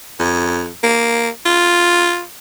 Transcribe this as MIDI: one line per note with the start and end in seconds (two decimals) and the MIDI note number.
0.20 0.71 41
0.83 1.29 58
1.46 2.22 65